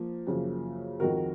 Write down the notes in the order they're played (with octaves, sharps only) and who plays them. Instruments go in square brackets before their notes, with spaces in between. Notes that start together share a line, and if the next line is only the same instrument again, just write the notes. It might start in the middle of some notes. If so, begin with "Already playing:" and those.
Already playing: [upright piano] F3 A#3
F#2 C#3 F3 A#3
F2 D#3 G#3 F#4 A#4